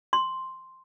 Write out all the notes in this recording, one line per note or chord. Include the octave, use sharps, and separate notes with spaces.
C6